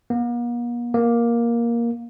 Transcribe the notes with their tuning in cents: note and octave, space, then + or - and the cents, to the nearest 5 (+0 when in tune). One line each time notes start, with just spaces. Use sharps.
A#3 +45
A#3 +10